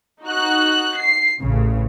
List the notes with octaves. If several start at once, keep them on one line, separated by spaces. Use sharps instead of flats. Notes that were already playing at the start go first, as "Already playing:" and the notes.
D#4 F#4 F#6
C7
A1 C#3